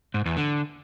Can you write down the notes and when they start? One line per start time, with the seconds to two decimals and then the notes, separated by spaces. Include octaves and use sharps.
0.14 G#2
0.26 E2
0.37 D3